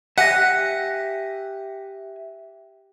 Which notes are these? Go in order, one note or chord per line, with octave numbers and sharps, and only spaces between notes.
G4 E5 F#5 G#5 F#6 A#6